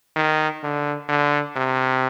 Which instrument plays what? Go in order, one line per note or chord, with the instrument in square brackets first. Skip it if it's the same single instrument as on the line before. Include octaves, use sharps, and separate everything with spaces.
[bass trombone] D#3
D3
D3
C3